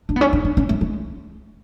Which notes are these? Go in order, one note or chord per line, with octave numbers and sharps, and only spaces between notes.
D4
B3
C#4
D4
D4
C#4
A3
G#3